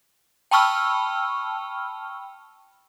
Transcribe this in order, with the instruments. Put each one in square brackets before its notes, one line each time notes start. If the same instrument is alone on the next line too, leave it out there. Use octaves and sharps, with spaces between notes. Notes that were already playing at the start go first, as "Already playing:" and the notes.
[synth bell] G5 A5 B5 C#6 E6 F6